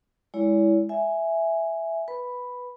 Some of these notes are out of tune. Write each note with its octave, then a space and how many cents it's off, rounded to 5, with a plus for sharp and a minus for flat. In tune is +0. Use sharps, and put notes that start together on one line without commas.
G#3 +0 E4 +0 C#5 +45
E5 +0 G#5 +0
B4 +0 B5 +0